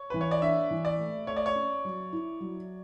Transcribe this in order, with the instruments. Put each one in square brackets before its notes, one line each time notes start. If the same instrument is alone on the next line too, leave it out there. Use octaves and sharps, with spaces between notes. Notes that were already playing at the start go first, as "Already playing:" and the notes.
Already playing: [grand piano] C#5
[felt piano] E3 [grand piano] B4
[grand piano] C#5
D5
[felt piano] D4 [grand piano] E5
[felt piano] E3
[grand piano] D5
[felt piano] A3
[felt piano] A3 [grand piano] C#5
[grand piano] D5
C#5
[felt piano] C#4
F#3
E4
F#3